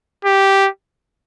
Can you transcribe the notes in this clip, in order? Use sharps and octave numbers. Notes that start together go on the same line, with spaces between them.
G4